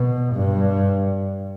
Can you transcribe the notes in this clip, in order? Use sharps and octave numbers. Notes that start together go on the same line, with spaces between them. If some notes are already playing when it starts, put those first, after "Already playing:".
Already playing: B2
G2